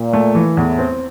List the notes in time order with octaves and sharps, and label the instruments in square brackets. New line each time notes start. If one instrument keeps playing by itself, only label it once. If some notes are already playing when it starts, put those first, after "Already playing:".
Already playing: [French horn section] A#2
[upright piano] A3
E3
[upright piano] E2 [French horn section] A2
[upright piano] C4